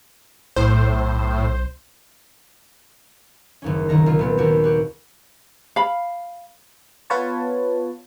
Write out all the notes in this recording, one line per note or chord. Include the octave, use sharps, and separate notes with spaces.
B1 A2 C5
F#1 D#2 C#4
C2 D#3 A#5
C2 C#3 F4
A#2 B3 C4
D#2 F#4 G4
F#4 G4
F5 B5
B3 F4 B4 C#5 A5